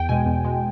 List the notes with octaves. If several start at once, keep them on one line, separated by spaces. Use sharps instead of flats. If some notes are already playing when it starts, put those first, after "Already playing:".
Already playing: E2 G5
B2 G#3 G#5
E2
B2 G#3